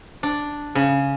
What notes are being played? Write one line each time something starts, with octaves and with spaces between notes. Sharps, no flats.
D4
C#3